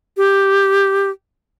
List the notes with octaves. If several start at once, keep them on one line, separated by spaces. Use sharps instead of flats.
G4